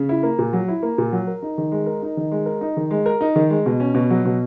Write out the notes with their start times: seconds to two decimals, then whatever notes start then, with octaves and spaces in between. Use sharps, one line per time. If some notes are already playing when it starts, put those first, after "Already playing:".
Already playing: C#3
0.09 E4
0.23 A#3
0.39 A#2
0.53 F#3
0.68 E4
0.83 A#3
0.98 A#2
1.12 F#3
1.27 A#4
1.42 D#4
1.58 D#3
1.72 G#3
1.86 A#4
2.02 D#4
2.17 D#3
2.31 G#3
2.46 A#4
2.61 D#4
2.77 D#3
2.91 G#3
3.06 A#4
3.21 D#4
3.36 D#3
3.50 G#3
3.66 B2
3.80 C#4
3.95 B2
4.10 F#3
4.25 B2